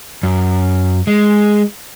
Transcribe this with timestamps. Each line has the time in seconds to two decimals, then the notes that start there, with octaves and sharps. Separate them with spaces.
0.23 F#2
1.07 G#3